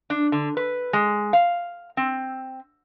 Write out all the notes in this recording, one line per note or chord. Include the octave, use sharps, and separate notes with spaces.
D4
D3
B4
G#3
F5
C4